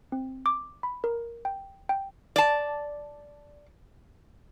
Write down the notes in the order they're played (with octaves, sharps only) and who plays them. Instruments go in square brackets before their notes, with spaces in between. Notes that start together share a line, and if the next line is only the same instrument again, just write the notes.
[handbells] C4
D6
B5
A#4
G5
G5
[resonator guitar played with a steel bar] D5 A5